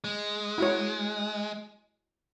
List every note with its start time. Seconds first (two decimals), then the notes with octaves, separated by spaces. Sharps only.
0.04 G#3
0.58 E4 F#4 C#5